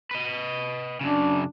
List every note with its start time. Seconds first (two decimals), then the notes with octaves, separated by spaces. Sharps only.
0.11 B4 D#5
1.01 F#2 C#3 D4